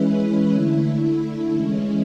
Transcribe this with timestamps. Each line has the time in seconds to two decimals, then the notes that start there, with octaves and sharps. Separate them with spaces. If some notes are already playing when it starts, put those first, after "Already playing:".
Already playing: E3 G#3 C#4 E4 B4
0.53 D3 A3 E4
1.53 E3 G#3 C#4